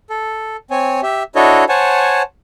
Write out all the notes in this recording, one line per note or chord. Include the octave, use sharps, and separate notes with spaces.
A4
C4 C#5 G#5
G4 E5
D4 E4 F#4 A4 C#5 D#5
C5 C#5 F#5 G#5 A5